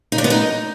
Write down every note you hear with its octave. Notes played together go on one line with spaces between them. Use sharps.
D#4
D4
B3
D#4